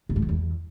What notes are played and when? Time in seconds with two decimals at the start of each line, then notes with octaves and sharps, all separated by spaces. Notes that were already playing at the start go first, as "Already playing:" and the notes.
0.09 A#2
0.16 G#2
0.22 E3
0.29 E2